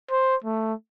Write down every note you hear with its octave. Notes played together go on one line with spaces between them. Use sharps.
C5
A3